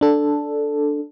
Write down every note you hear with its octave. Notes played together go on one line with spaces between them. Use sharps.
D4 A4